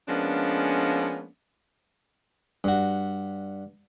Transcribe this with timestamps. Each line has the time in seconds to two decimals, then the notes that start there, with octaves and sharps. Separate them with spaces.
0.08 F3 G#3 A#3 B3 C#4 D4
2.64 G2 F#4